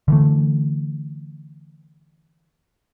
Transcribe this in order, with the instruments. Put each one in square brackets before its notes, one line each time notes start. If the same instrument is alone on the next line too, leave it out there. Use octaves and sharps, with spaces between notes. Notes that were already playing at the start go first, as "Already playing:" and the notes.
[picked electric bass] D3 E3 A3